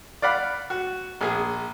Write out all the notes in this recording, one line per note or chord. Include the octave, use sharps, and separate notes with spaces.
D5 F5 F#5 B5
F#4
A#1 G#4